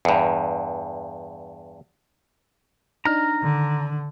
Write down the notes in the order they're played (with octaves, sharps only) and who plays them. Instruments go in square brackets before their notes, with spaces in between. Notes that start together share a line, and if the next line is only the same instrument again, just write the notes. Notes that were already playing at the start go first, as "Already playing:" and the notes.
[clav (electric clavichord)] E2 G2
[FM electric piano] D4 D#4 [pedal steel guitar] A#5 F6
[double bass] D3 [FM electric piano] D#3